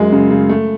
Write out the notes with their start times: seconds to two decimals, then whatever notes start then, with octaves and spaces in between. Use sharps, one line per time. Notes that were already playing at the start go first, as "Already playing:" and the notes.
Already playing: F#2 G#3
0.12 C#3
0.31 C#3
0.49 A3